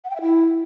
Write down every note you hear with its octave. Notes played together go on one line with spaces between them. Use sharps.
F#5
G5
E5
E4